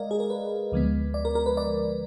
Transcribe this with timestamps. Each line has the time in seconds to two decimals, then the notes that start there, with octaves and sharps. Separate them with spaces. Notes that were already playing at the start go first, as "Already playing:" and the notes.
Already playing: G#3 A#4 D5 D#5 F5
0.11 G#4
0.20 A#4
0.30 B4
0.72 D2 D3 F3 G#3 B3
1.14 D5
1.25 A#4
1.35 A#4
1.46 B4
1.57 D5